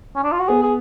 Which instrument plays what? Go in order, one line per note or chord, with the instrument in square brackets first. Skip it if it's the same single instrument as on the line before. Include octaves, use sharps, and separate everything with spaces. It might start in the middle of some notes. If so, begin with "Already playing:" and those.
[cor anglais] C#4
D4
F4
F#4
[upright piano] B3 [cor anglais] G#4
[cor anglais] G#4